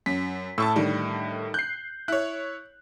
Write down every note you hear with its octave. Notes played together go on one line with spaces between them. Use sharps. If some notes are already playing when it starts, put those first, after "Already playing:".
F#2 B6
A2 A5 C#6 E6
D3 D#3 G3
F#6 G6 C7
E4 C#5 F#6